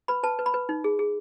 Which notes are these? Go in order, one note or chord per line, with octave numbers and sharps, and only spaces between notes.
B4 B5
B4 A5
B4
B5
B4
D#4
G#4
G#4